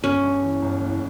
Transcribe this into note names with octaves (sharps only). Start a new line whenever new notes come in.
G1 C#4
G2
E3
G1
F#1